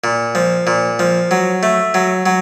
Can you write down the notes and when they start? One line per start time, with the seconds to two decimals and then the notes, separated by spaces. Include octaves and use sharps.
0.04 A#2
0.35 F3
0.67 A#2
0.99 F3
1.31 F#3
1.63 A3
1.94 F#3
2.26 F#3